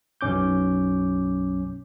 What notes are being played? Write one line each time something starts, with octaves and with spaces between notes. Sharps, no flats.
B1 F#2 C#4 D6 G6